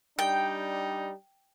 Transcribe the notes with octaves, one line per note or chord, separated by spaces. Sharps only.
G3 D4 D#4 G5